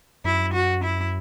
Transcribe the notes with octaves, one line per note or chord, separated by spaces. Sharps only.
F#2 E4
F#4
E4